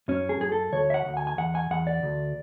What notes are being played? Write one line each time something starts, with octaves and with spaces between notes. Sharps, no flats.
F#2 C#4
G#4
F#2 G#4
A4
D2 C#5
E5
F#5
D2
G#5
G#5
E2 F#5
G#5
E2 F#5
D5
D2